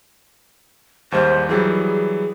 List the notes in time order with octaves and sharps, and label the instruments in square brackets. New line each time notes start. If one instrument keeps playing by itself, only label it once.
[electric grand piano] D#2 G#2 G3 [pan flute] C5
[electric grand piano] E3 F#3 G3 [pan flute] G#4